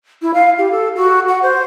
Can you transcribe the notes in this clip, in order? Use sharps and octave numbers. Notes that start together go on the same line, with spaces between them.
E4
F5
G4
A4
F#4
F#5
C5